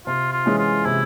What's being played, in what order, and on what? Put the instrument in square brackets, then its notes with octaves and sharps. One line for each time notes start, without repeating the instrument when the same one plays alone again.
[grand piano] C3 [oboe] F4
[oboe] F4
[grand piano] E3 G#3 C#4
[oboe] F4
[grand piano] C3 [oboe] E4